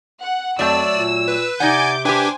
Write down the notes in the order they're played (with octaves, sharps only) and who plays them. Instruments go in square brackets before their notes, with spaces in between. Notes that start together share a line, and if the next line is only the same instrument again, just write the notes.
[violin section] F#5
[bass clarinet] F2 [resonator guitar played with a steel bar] F#3 A3 A5 [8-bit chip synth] D5 [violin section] E6
[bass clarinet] A#2
[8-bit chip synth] B4
[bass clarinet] C3 [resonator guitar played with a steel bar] D#4 D5 F#5 [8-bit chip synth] G#5 G#6 [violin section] D6 G6
[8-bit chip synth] D4 G5 D6 [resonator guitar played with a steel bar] G4 B4 [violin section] C5 G#5 G#6